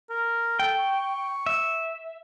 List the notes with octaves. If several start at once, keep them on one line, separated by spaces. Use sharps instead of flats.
A#4
A4 G5
C#6
E5